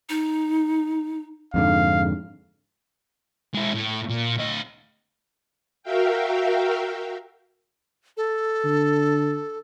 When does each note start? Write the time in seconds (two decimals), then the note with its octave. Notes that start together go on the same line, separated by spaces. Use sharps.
0.09 D#4
1.54 F2 G#2 D3 F5
3.54 G#3 E4
3.74 A2
4.09 A#2
4.38 D2 D#5
5.83 F#4 A#4 E5 F5 G5
8.17 A4
8.64 D3